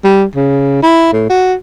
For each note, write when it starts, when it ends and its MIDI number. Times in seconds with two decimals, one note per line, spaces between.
0.04 0.24 55
0.35 0.80 49
0.83 1.10 64
1.13 1.29 45
1.30 1.54 66